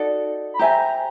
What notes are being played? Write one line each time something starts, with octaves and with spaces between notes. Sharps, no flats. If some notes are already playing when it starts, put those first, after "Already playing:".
Already playing: D#4 F#4 A4 D5
B5
G4 C5 E5 G#5 A#5